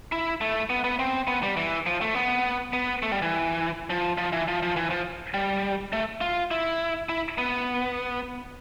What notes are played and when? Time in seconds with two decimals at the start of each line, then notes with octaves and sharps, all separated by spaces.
0.12 E4
0.41 A3
0.70 B3
0.84 B3
0.99 C4
1.28 B3
1.43 G3
1.57 E3
1.86 F3
2.01 A3
2.15 B3
2.73 B3
3.03 A3
3.12 G3
3.22 E3
3.90 F3
4.18 F3
4.32 E3
4.48 F3
4.62 F3
4.76 E3
4.90 F3
5.34 G3
5.93 A3
6.21 F4
6.51 E4
7.09 E4
7.38 B3